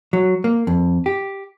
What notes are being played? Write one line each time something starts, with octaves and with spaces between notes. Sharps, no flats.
F#3
A#3
F2
G4